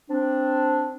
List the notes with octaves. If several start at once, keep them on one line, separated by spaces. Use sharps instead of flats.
C4 D4